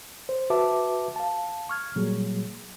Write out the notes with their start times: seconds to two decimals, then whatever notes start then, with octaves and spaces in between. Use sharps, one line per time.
0.29 C5
0.50 F#4 B4 E5 A5 D6
1.16 F5 A5
1.69 C#6 F6 G#6
1.96 A#2 F#3 G3 A#3 G#4